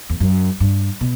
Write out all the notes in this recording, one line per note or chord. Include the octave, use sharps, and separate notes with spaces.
E2
F#2
G2
B2